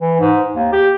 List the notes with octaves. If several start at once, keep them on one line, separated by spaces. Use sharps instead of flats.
E3
G#2
D#2
G4